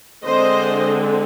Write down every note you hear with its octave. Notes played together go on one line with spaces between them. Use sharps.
D3 G#3 C4 C5 D#5